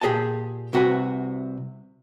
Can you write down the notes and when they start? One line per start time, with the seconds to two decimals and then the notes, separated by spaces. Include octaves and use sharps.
0.01 A#2 G4 G#4 D#5 G#5 A5
0.73 C2 C3 F#4 G4 B4 G#5